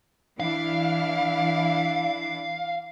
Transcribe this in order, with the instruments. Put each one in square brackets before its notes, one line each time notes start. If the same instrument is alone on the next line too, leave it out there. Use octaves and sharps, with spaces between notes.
[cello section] E3 D4 E4 [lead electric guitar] F5